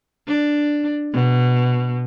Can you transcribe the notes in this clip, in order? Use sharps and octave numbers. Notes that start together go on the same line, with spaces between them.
D4
B2